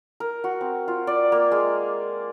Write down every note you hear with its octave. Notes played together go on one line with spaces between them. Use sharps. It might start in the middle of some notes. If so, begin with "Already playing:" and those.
A#4
F#4
C4
F4
D5
A#3
G#3